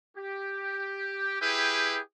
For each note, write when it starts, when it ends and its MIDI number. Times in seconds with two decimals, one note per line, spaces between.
0.18 1.41 67
1.41 1.98 64
1.41 1.98 67
1.41 1.98 68
1.41 1.98 71
1.41 1.98 76
1.41 1.98 79